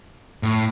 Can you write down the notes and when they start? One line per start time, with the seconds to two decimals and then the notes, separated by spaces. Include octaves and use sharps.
0.43 A2